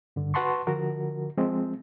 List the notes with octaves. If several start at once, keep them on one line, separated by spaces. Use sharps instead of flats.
G2 D3
F#4 B4 F#5 A5 C6 C#6
D3 F3 F#4 A#4
F3 G#3 C4